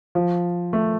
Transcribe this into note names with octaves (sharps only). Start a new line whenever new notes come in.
F3
A3